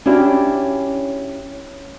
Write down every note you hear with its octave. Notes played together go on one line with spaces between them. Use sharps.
C#4 D4 E4 F#4 G4